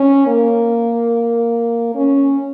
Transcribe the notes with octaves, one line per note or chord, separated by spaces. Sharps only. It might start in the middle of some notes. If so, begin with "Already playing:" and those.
Already playing: C#4
A#3
C#4